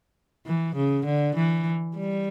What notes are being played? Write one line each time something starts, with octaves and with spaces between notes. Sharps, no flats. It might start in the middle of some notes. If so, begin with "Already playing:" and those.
E3
C#3
D3
E3
G3